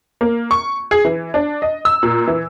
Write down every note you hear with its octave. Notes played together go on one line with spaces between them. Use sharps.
A#3
C#6
G#4
E3
D4
D#5
E6
A#2
E3